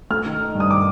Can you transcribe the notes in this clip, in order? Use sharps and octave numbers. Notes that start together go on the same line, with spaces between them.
A3 F6
D#3
D#4
G2
D#6
D#3 D6